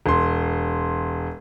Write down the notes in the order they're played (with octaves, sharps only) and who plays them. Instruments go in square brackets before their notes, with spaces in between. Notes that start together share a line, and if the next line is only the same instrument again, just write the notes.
[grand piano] E1 C6